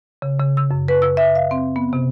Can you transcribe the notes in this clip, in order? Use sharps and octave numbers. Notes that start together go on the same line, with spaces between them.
C#3
C#3
E6
F#2
B4
E6
E5
F5
C4
B3
C3